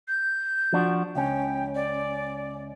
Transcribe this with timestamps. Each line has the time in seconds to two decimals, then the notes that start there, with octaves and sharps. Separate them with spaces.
0.08 G6
0.73 F3 D4 F#4
1.15 C#2 C#4 G5
1.75 D5